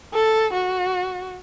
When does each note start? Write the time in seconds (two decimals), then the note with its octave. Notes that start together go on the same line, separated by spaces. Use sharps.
0.13 A4
0.53 F#4